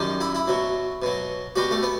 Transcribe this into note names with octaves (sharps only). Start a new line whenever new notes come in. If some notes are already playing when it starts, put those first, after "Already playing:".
Already playing: F#2 D#3 G3
E4
E4
B2 F#3
B2 F#3
B2 G3 F#4
A3
B3